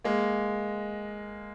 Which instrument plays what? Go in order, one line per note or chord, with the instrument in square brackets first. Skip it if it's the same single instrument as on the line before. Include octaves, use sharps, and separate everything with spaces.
[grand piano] G#3 A#3